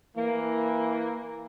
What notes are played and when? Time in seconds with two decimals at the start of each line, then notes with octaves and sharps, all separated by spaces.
0.16 E3 A#3